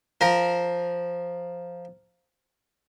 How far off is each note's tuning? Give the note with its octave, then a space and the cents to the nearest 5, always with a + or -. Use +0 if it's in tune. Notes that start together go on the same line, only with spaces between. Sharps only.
F3 +0 A#4 +0